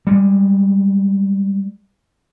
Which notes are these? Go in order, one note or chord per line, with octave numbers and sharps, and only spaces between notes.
G3 G#3